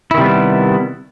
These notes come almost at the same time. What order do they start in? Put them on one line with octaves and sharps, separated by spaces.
E4 D#3 C3 G3 B3